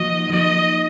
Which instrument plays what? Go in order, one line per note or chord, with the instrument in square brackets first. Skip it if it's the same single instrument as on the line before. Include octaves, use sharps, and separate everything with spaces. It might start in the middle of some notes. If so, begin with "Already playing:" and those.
Already playing: [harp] F3 A#3 D#4 F#4 [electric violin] D#5
[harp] F3 A#3 D#4 F#4 [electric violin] D#5